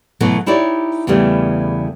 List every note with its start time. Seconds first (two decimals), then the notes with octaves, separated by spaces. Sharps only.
0.20 B2 E3 F#3 A3 B3
0.46 D#4 E4 G4 C#5 D5
1.07 E2 C#3 E3 G3 A3 B3